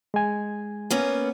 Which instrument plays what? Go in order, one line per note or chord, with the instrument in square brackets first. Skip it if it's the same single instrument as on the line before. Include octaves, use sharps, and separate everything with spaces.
[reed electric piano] G#3 G#5
[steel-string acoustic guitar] A#3 B3 C#4